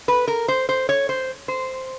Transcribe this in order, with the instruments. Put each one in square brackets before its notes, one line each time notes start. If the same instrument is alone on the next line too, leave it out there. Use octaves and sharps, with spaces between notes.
[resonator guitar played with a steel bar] B4
A#4
C5
C5
C#5
C5
C5